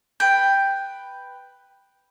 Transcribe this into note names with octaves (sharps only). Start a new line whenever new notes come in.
B4 G5